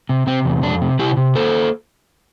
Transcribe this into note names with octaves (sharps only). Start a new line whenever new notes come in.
C3
C3 C4
E2
F2 D4
C3
C3 E4 G4
C3
A#3 A4 C5